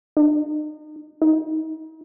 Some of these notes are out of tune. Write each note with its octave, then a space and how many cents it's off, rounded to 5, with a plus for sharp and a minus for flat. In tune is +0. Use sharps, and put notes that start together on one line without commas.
D#4 -35
D#4 +35